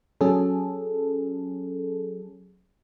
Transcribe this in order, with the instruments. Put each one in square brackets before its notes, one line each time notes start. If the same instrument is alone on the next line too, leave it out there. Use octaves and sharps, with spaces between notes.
[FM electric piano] F#3 C#4 G#4 A4